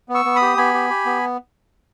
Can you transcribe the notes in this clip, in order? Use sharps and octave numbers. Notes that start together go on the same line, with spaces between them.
B3
C#6 E6
B3
B5 D#6
G4
B3 G#5 B5
G4
G4
B3